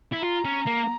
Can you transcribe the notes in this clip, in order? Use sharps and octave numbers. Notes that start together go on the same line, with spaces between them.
E4
F4 A#5
C#4
A#3